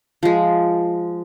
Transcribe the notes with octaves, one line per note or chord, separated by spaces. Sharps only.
F3 G#3